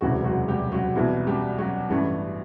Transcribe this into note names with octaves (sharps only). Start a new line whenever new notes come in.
E1 D2 C3 E3 F#3 F#4
F#3 F#4
G3 G4
F#3 F#4
C2 B2 E3 E4
G3 G4
F#3 F#4
A1 G2 E3 A3